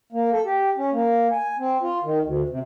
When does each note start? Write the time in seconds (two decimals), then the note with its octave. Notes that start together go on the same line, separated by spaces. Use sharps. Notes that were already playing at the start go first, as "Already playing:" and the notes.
0.13 A#3
0.33 A4
0.45 G4
0.78 C#4
0.92 A#3
1.32 G#5
1.58 C4
1.82 F4
2.03 D#3
2.22 D2
2.49 C3